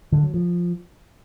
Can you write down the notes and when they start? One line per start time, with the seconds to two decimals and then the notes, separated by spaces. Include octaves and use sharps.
0.12 D3
0.23 F#3
0.34 F3